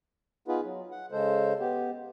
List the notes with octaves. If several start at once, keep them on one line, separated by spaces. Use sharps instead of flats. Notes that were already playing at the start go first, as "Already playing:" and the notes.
B3 D#4 F4 G#4 B4
F#3
F#5
C#3 G#3 A4 C5
B3 G4